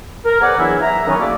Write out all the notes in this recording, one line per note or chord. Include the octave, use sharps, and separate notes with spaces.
A#4
B3 G#4 B4 C5 D5 F#5
E2 E3 F#3 D4 E4
E5 A#5
D#3 F#3 B3 C#4
A3 A#3 F#4 G#4 A4 D5